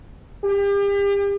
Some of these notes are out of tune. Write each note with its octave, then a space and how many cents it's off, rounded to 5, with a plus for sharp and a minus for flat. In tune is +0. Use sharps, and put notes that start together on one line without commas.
G4 +35